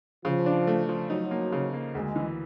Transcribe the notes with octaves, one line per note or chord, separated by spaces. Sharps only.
C#3 F3
D4
A3
F3
F#3 D#4
A#3
C#3
A#3
D2 G#3
E3